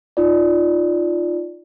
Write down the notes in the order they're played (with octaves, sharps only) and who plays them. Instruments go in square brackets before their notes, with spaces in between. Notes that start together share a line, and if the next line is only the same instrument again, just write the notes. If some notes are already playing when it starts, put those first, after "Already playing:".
[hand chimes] D#4 F4 D5